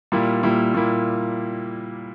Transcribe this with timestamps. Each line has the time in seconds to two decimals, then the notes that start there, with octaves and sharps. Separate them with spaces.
0.12 A#2 G3 A#3 E4
0.43 A#2 G3 A#3 E4
0.74 A#2 G3 A#3 E4